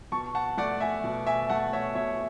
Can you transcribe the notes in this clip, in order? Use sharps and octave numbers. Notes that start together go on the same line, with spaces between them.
B2 A5 C#6
F#5 A5
A3 D5 F#5
E5 G#5
B2
E5 G#5
A3 F#5 A5
C#5 E5
B2 C#5 E5